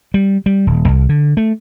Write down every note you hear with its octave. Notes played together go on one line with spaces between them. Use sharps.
G3
G3
D#1
C2
D3
A3